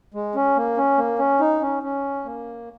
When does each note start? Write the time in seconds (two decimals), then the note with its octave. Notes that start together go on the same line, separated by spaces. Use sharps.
0.14 G#3
0.35 C#4
0.57 A#3
0.78 C#4
0.98 A#3
1.19 C#4
1.41 D#4
1.61 C#4
1.83 C#4
2.25 A#3